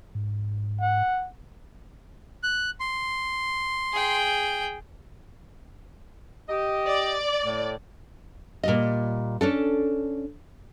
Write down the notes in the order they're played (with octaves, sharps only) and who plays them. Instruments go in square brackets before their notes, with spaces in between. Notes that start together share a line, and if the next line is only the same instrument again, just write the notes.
[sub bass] G#2
[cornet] F#5
[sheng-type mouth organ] F#6
C6
[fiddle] G#4 G5
[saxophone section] G4 D#5
[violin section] D5
[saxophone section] A2
[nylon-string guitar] A#2 G3 D#5
C#4 D4 A4